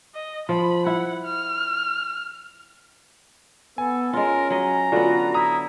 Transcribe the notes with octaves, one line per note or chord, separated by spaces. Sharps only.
D#5
F3 B5
E4 F#5
F6
B3 A4 G#5
G#3 C#4 F4 A#4
F#3 D#5 A#5
D3 B3 F4 F#4 D5
E4 A#5 D#6